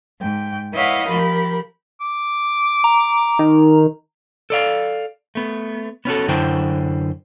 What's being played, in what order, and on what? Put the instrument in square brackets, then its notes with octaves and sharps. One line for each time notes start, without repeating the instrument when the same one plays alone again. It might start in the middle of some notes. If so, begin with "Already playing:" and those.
[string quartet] G#2 G5
E4 B4 C#5 D#5 F5 F#5
F3 G4 A#4 B5
[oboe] D6
[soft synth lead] A#5
[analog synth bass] D#3
[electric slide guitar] A4 D5 F5
A3 B3
B3 C#4 F#4 A4
F#2 D3 E4 C5 G5 A5